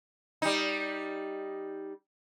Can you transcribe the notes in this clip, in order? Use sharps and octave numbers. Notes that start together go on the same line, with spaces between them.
G3 D#4